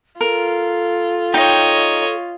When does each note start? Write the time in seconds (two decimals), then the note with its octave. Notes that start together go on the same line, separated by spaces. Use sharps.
0.21 F4 A4 A#4
1.34 D#4 C#5 D#5 G5